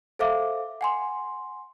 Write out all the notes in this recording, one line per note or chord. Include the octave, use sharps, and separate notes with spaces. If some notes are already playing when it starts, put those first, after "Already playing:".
A4 C5 E5 F5 D6
F#5 G#5 C6